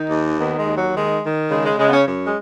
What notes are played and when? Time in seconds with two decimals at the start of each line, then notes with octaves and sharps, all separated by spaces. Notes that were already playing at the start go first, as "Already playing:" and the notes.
Already playing: D#3 D#4
0.09 D#2
0.38 D#3 B3
0.57 G#3
0.66 D#2
0.75 F#3
0.93 D#3 G#3
1.22 D#3
1.50 C#3 G#3
1.65 G#3
1.78 C#3 G#3
1.88 B3
1.92 C#4
2.06 F#2 C#4
2.24 G#3